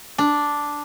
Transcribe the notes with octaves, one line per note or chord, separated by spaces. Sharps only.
D4